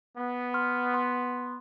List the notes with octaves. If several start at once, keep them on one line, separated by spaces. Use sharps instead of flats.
B3
C6 F6
C6